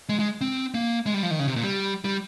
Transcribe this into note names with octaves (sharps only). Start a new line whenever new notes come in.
G#3
G#3
C4
A#3
G#3
G3
F3
D#3
C#3
C3
A#2
G3
G3